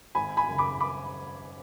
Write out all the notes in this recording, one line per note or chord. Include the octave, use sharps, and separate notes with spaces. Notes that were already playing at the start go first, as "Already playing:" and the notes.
G#1 G#5 B5
G#5 B5
F#2 C#3
B5 D6
B5 D6